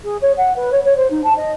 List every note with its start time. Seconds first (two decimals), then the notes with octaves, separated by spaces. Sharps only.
0.03 G#4
0.21 C#5
0.37 F#5
0.56 B4
0.72 C#5
0.85 C#5
0.97 C5
1.10 D#4
1.23 A5
1.37 D#5